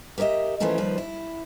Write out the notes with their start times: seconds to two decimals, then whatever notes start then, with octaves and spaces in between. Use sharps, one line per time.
0.18 G4 A#4 C#5 D#5 E5
0.60 E3 F3 A3 C#4 F4 A#4
0.78 D#2 F3 G3 F4 B4
0.98 E4